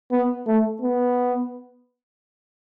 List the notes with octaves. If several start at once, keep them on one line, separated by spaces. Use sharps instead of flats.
B3
A3
B3